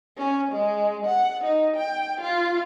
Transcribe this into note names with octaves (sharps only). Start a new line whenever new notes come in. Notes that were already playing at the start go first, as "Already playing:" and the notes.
C#4
G#3
F#5
D#4
G5
F4